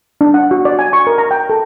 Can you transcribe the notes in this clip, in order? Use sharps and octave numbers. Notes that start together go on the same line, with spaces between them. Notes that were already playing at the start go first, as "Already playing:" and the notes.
D4
F#5
F#4
D5
G#5
C#6
A#4
A#5
G5
A4